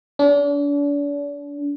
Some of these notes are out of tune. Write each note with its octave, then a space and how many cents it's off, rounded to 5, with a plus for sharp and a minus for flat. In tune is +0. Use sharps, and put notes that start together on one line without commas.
D4 -40